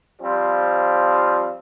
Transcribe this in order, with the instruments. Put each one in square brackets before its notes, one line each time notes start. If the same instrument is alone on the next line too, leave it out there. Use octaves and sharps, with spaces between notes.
[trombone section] F3 G3 C4 F4